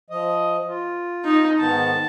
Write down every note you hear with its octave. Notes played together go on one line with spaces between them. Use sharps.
F3 D#5
F4
D#4
G#2 D#3 B3 A5